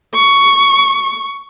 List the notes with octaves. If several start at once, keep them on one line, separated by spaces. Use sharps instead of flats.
C#6